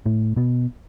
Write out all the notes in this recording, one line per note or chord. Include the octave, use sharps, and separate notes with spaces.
A2 A3
B2 B3